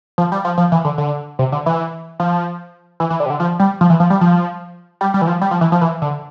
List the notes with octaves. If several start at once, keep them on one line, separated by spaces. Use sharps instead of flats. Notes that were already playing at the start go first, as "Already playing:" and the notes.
F3
G3
F3
F3
E3
D3
D3
C3
D3
E3
F3
E3
E3
D3
C3
D3
F3
G3
F3
E3
F3
G3
F3
G3
G3
E3
F3
G3
F3
E3
F3
E3
D3